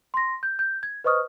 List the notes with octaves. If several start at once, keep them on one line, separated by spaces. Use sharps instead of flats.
C6 A#6
G6
G6
G#6
B4 C5 D#5 C#6 D#6 F6